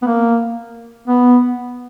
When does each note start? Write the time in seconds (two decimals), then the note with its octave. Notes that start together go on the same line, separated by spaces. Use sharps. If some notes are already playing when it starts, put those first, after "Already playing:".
0.02 B3
0.07 A#3
1.08 B3